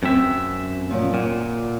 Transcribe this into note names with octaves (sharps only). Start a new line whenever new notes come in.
F#2 C4 E5
A#2 F3 C#4
A#2 F#5